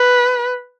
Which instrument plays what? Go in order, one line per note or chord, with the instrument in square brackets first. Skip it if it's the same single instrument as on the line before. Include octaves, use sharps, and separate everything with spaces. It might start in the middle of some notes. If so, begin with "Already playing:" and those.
Already playing: [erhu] B4